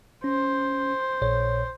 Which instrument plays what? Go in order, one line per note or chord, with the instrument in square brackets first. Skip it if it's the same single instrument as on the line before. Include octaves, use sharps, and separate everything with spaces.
[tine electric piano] C#4 [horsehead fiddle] C5
[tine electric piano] A#1 A#2 C#5